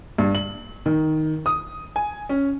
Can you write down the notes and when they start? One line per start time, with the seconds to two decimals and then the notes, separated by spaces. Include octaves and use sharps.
0.18 G2
0.35 F#7
0.86 D#3
1.46 D#6
1.96 G#5
2.29 C#4